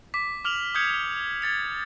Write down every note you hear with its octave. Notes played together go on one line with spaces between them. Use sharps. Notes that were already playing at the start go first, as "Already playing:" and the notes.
D6 B6
D6 F6 F7 F#7
D#6 F6 G6 G#6 C#7
G#6 A6 C#7